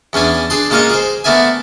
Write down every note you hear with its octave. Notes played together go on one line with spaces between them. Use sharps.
E2 C#4 D4 G#5
D4 G#4 C6
G#3 A#3 C#4 F4 C#5 D#5
G#4 C5
A3 B3 A#4 D5 E5 G#5